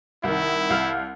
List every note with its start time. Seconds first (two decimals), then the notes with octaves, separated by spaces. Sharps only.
0.24 C2 D#3 E4
0.70 C2 F5 F6